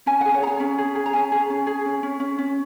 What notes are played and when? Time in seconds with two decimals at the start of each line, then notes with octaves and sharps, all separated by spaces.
0.06 C#4 G#5
0.21 G#4 F#5
0.34 C#5
0.42 G#4 A#5
0.47 G#5
0.60 C#4
0.78 G#4
0.95 G#4
1.06 A#5
1.13 C#4 G#5
1.32 G#4
1.50 C#4
1.67 G#4
1.85 C#4
2.03 C#4
2.20 C#4
2.39 C#4